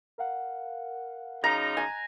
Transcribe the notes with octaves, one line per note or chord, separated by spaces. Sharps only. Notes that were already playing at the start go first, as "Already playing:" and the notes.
A#4 F5 F#5
F#2 C#3 D#4 A#5
G#5 A#5 F#6 A6